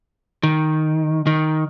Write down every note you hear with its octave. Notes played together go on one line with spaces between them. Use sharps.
D#3
D#3